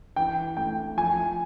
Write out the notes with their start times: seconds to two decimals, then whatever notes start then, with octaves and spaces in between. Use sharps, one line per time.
0.16 E3 G5
0.57 A3 G5
0.97 F3 G#5